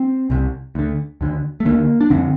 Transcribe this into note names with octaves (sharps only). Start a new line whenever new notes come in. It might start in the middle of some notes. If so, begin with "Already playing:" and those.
Already playing: C4
C2 C3
D2 D3
D#2 D3
A3
D#2 D3 A#3
D4
F2 D3 C4